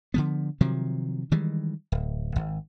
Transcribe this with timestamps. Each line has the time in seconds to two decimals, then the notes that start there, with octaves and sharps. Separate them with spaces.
0.14 D3 F3 B3
0.61 C3 D#3 F3 F#3
1.31 D#3 E3 G3 G#3
1.92 D1
2.36 G#1